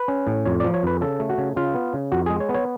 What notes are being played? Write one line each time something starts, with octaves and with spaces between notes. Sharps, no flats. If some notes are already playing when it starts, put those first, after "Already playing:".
Already playing: B4
C#4
A2
F2 C#5
F3 D5
C#5
F2 B4
C#3 A4
A3
F#4
C#3
C#3 F4
B3
C#3
F2 F#4
G#3 G#4
C#5
B3
C#5